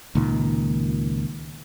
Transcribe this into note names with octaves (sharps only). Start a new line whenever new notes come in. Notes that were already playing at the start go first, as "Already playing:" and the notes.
C#2 A#2 D#3